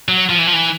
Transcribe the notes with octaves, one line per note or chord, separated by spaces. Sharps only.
F#3
F3
E3
F3
E3